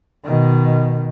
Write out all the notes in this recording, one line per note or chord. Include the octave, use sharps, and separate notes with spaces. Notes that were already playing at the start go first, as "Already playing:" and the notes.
B2 D#3